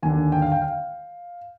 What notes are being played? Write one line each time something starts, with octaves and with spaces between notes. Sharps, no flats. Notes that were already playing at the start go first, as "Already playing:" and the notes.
D#2 D3 G#5
G5
F5
G5
F5